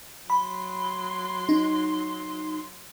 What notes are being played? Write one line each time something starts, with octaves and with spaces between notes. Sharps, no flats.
F#3 B5 C6
D#4